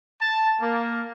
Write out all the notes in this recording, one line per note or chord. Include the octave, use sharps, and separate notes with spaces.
A5
A#3